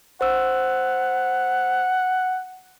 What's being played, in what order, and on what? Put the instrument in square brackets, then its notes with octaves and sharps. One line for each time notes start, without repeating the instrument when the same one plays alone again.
[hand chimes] C5 E6 [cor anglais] F#5